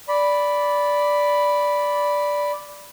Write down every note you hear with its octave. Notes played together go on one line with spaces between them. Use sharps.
D5 B5